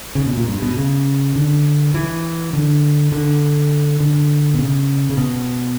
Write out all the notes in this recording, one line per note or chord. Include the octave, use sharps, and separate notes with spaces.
C#3
B2
A#2
G2
B2
C#3
D3
E3
D3
D3
D3
B2
C#3
C#3
B2